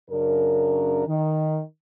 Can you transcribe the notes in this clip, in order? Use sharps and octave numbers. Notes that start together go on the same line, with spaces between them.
F#2 C#3 D4 A#4
D#3